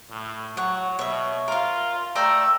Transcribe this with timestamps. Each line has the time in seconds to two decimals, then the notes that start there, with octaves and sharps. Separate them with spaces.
0.10 A2
0.57 F#3 C#5 F#5
0.99 B2 C#5 E5
1.48 F4 A#4 F5
2.15 A3 D5 G5 A#5 E6